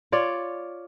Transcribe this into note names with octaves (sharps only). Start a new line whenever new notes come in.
F4 C#5 D5